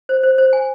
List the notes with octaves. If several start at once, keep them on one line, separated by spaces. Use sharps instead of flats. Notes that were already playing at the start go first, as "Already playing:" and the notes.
C5
C5
C5
G#5